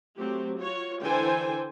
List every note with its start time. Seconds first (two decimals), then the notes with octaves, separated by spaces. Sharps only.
0.16 F#3 A3 C4 G4
0.58 F4 F#4 C#5
1.01 D3 E3 A4 C5 G5 G#5